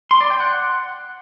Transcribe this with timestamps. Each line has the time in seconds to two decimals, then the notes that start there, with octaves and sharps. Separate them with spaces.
0.11 C6
0.21 D5
0.30 G5
0.40 F#5